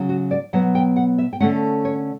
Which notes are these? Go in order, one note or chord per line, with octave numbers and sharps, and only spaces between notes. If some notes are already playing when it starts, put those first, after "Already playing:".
Already playing: C#3 F#3 C#4
F#4
D5
B2 F#3 B3 F#5
G5
F#5
E5
G5
D3 A3 C#4 F#5
C#5